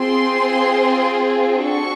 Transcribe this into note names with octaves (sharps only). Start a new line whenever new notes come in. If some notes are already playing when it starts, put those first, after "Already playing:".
Already playing: C4 F4 G#4 C6
D4 F#4 A4 C#6